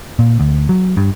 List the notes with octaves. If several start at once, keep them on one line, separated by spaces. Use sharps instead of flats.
A#2
D2
F#3
G2